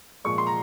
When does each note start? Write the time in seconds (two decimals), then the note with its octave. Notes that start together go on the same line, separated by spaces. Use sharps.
0.25 A#2 F3 G#3 C#6
0.38 C6
0.47 A#5